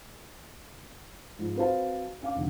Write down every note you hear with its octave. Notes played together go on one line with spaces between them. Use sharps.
G#2 F3
C4 F#4 B4 C5 F5 A5
C#4 F5 D6
F1 D3